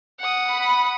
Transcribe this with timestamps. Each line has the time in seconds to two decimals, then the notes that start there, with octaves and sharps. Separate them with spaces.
0.20 F#5 D#6
0.49 B5